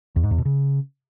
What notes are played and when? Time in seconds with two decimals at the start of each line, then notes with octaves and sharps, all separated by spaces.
0.16 E2
0.23 G#2
0.31 E2
0.38 B2
0.45 C#3